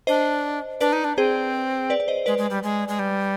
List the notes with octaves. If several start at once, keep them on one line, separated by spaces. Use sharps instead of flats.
D4 C5 D#5
D4 B4 D5
D#4
D4
C4 G#4 C5
B4 D5
D5
C5 D#5
G#3 B4 D5
G#3
G3
G#3
G#3
G3